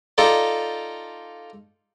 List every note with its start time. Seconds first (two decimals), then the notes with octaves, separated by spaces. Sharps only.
0.18 D#4 F4 A4 D5 G5